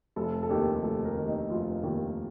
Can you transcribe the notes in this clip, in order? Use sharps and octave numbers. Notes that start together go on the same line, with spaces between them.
F1 A4
A4
D#2 D#3 G4
F1 A4
A#4
D#2 D#3
D#4
F1 F4
D#2 D#3